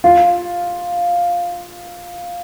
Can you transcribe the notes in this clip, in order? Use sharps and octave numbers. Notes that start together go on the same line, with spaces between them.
F4